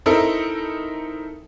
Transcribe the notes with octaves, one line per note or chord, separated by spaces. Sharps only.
C4 D#4 E4 A4 A#4